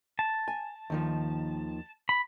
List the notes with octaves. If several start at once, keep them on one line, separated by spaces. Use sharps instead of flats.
A5
G#5
D#2 D#3 F3
B5